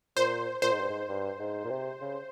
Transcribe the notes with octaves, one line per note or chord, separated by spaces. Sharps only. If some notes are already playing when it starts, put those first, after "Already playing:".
A#2 C5
A#2 C5
G#2
G2
G#2
G2
G#2
A#2
C3
C#3